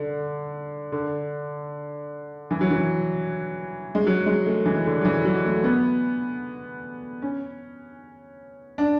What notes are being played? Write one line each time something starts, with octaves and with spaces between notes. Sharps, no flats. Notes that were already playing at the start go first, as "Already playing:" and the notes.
Already playing: D3
D3
E3
F#3
E3
G#3
F#3
G#3
A3
E3
D3
F#3
E3
F#3
A3
B3
C#4
D4